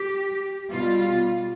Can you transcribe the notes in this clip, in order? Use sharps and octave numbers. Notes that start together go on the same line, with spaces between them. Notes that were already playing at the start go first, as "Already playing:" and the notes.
Already playing: G4
B2 G3 F4